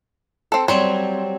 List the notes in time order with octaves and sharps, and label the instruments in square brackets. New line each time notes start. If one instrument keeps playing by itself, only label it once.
[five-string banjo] C4 A4
[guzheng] F#3 G3 C4 [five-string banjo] C5 C#5